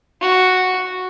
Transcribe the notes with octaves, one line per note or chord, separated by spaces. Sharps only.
F#4